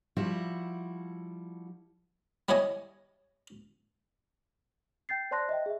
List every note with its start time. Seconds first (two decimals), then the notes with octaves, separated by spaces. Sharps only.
0.17 F3 G3 E4 F#4
2.49 G3 E4 C#5 D#5 G#5
5.09 G5 G6 A6 C7
5.31 C5 D5 A5 C6 F#6 A#6
5.49 D#5 E5 G5
5.66 G#4 E5